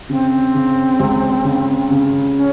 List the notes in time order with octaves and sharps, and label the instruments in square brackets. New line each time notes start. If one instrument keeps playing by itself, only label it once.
[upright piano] C#3 [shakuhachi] C4
[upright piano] C#3
C#2
C#3
C#3
[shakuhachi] C#4